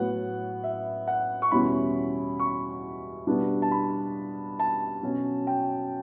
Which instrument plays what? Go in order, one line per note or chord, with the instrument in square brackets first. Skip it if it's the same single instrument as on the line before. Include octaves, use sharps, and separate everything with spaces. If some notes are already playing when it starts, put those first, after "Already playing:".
Already playing: [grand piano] A2 F#3 B3 F#5
E5
F#5
C#6
E2 B2 G3 C#4 E4 B5
C#6
B2 G3 B3 D4
A5
B5
A5
B2 F#3 C#4
G5